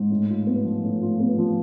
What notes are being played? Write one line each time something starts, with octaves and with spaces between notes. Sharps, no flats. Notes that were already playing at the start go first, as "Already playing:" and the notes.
Already playing: G#2
A2
F4
B3
F3
A2
F4
B3
F3